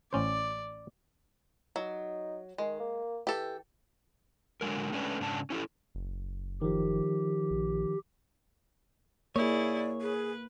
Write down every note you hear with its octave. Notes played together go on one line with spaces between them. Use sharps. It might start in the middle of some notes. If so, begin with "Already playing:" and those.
A1 C#4 C5 D5
F#3 D#4
D#3 G#3
A#3
E3 G4 A4
D3 F#3 G#3 A#4
G#3 A3 C#4 D4 B4
G#2 C#3 D4 A5
C#4 E4 G4 A4
F#1
D#3 F3 G4
A#1
A#3 E4 G#4 C#5 D5
G#4 B4